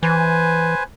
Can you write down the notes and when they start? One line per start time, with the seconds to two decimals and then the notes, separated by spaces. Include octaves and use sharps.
0.03 E3 B4 C5 G#5